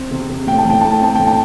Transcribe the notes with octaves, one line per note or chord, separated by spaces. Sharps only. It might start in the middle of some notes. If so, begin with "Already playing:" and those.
Already playing: C4
C3
C3
A2 G5
A5
A2 G5
A3 A5
G5
C4 A5
A2 G5
A5